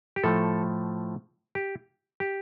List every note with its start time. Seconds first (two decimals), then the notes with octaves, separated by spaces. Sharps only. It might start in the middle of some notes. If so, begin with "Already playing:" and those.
0.16 G4
0.24 A2 F3 A3 A4
1.55 G4
2.20 G4